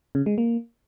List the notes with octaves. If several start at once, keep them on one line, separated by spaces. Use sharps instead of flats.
C#3
G#3
A#3